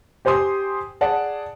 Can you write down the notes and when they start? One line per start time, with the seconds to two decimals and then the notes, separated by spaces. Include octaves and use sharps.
0.25 G4 C5 G#5 C6 D#6
1.01 G#4 D5 F#5 A5